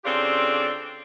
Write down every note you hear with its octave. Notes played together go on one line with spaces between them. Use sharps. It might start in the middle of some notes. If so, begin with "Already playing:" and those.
C#3 C4 D4 F4 G4 A4